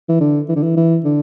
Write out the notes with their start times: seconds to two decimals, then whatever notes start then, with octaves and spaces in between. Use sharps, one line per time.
0.09 E3
0.20 D3
0.49 E3
0.55 D3
0.63 E3
0.77 E3
1.04 D3